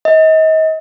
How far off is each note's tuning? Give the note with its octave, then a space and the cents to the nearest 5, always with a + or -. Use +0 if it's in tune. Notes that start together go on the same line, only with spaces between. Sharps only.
D#5 +35